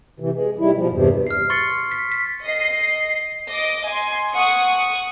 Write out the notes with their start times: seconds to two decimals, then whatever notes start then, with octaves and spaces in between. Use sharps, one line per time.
0.20 C3 E3
0.34 G#3
0.59 C3 D#3 G3 E4
0.76 B2 F3
0.91 E2 G2 C3
1.27 F6 C7
1.50 C6 C#6 A6 C7 C#7
1.91 B6
2.12 B6
2.45 D#5 C7
3.49 D#5 D6
3.88 G#5 C6
4.32 F#5 C#6 D#6